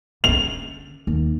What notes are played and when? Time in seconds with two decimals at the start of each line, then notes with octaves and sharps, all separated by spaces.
0.24 D3 C#4 F7
1.07 D#2 D#3